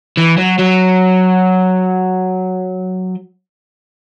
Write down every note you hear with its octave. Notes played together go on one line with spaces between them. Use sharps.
E3
F#3
F#3